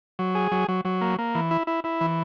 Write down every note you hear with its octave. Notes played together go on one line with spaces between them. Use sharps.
F#3
G#4
F#3
F#3
F#3
A#3
A#3
E3
E4
E4
E4
E3